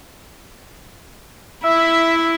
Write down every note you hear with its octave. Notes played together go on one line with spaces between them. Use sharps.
E4 E5